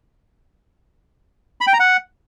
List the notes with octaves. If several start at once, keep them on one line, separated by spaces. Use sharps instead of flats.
B5
G5
A#5
F#5